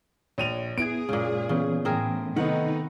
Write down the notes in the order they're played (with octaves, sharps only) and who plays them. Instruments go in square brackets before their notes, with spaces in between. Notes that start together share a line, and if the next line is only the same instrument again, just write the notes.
[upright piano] A#1 D#7 F7 [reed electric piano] C#5
[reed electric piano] B3 E4 G#6 [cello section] G#4 [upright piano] D7
[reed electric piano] F#2 G#3 [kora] A#2 C#3
[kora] C#3 [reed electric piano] E3 B3 C#4
[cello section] A2 [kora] C4 G#4 A#4
[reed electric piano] C3 [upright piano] D#3 A3 B3 [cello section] D#4 [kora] F#5